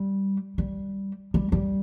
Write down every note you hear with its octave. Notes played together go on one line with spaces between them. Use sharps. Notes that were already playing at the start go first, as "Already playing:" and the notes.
Already playing: G3
G3
G3
G3